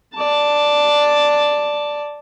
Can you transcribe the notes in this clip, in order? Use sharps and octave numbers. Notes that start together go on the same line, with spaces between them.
D5 A5